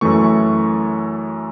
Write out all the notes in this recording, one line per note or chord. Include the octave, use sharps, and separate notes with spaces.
F#2 E3 A3 C#6